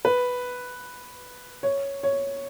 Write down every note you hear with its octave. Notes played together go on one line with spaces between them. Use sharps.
B4
C#5
C#5